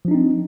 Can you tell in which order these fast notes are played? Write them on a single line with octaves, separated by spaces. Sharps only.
F3 D4 D#4 C4